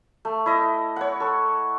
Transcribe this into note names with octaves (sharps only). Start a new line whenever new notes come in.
A3
E4 D#5
C#5 F#5
A4 C#6